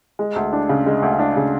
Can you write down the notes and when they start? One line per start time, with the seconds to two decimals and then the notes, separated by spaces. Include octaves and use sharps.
0.19 G#3
0.36 D2
0.53 D4
0.69 C#3
0.86 G#3
1.02 D2
1.19 D4
1.36 C#3